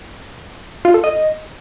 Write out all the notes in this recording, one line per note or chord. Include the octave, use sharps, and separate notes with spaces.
F4
A4
D#5